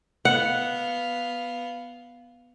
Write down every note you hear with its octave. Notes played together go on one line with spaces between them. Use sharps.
B3 F5 F#5